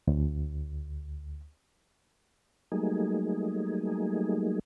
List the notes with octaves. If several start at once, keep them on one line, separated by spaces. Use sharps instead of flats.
D2
F#3 G3 A3 A#3 D#4 G#4